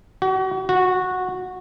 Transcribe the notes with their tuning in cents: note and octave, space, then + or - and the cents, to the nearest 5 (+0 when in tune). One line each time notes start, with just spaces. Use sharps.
F#4 +40
F#4 -10